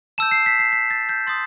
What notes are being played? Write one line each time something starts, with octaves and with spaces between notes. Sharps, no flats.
A5 E6 G6 E7
C7
B6
C7
B6
A6
G6
C6 D#6 A6